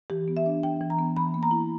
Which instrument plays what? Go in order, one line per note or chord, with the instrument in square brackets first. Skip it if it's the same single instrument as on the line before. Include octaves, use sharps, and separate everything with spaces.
[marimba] E3 G4
B3
E5
D4
E3 G5
E3
A#5
B3
E3 B5
A#3
A#5
E4